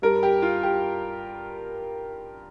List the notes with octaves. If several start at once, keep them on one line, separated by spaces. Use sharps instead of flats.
G2 G3 A#4
G4
F4
G4